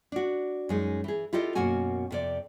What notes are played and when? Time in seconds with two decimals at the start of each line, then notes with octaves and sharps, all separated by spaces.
0.12 D4 F#4
0.69 F#2 G#3 D#4
1.04 E3 G#4
1.33 E4 F4 G4 A4 D#5
1.55 F#2 B2 A#3 F#4 G#5
2.11 F2 C3 D5